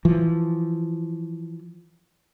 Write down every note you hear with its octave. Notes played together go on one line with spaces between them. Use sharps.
E3 F3